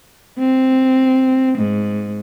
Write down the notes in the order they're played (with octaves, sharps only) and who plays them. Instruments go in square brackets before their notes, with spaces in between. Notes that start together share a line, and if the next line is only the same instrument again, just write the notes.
[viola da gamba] C4
G#2